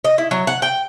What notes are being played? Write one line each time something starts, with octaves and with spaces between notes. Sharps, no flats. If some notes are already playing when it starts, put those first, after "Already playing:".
D#5
E4
F#3
F#5
G5